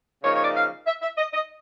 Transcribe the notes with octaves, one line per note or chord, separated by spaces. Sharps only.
C#3 F3 A#3 D#4 C#5
C#5
D5
F5
E5
E5
D#5
D#5